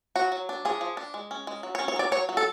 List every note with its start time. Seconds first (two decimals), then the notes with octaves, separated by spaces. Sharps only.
0.15 F#3 F#4
0.32 F#3
0.49 D4
0.65 F3 G#4
0.81 F3
0.97 D4
1.14 G#3
1.31 C#4
1.47 G#3
1.63 F#3
1.75 C#5
1.79 C#4
1.88 C#5
1.96 F#3 D5
2.12 F#3 C#5
2.29 F#3
2.37 A4